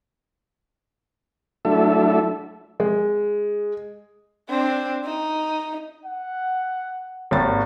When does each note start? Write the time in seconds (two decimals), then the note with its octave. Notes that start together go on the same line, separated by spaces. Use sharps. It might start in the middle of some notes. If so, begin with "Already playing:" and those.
1.65 F#3 A3 D4 E4 A4 E5
2.80 G#3
4.49 C4 D4
5.05 D#4
6.05 F#5
7.31 G#1 D#2 A6